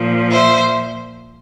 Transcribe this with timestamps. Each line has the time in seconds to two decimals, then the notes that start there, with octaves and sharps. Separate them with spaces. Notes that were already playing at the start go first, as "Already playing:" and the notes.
Already playing: A#2 F3
0.31 C5 E5